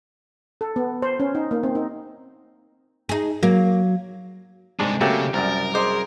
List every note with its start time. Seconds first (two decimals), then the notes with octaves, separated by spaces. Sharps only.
0.61 A4
0.76 B3
1.02 C5
1.20 C#4
1.35 D#4
1.51 A#3
1.63 C4
1.75 D#4
3.09 D#4 G#4
3.43 F#3 A#3
4.80 C2 G#2 G#3 C4 D4
5.01 C#3 F#3 A3 A#3 C4 G4
5.34 C2 F#2 A#4 D5
5.74 G#4 C5 D#5 D6